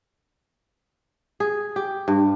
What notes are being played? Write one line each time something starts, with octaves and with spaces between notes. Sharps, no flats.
G#4
G4
G2